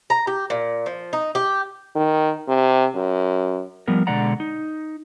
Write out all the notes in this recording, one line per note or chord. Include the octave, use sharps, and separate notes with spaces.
A#5
G4
A#2
F3
D#4
G4
D#3
C3
F#2
F3 G3 B3 A#4
B2 D3 G#3 D5 F#5 A#5
D#4